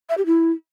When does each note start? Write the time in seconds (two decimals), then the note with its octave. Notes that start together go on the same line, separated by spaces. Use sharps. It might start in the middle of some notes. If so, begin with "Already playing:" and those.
0.09 E5
0.17 G4
0.26 E4